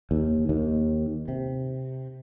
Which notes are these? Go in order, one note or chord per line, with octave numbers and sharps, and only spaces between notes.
D#2
D#2
C3